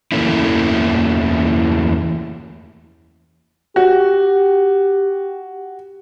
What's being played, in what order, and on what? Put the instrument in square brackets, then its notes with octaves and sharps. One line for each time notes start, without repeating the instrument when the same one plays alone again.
[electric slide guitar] E2 E3 A3 A#3 C#4 E4
[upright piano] F#4 [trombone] G4